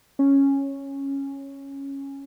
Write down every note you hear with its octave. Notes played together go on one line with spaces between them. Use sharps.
C#4